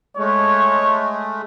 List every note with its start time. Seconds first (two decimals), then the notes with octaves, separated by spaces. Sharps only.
0.17 G#3 A3 C#5